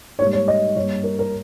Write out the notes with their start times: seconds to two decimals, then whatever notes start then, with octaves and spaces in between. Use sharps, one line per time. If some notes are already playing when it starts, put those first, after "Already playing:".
0.19 G#2 G3 A#3 C#5
0.33 C#5
0.48 D#5
0.76 G2 G3 A#3 C#5
1.04 A#4
1.19 A#4